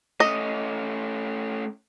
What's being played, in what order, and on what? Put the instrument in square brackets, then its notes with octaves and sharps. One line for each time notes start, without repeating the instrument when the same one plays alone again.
[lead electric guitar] A3 C#4 [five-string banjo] D#5